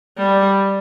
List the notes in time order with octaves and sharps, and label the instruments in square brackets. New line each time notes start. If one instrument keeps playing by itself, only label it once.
[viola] G3